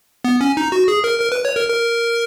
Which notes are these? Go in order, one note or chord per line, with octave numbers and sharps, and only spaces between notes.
B3
C#4
D#4
F#4
G#4
A#4
A#4
B4
C#5
A#4
A#4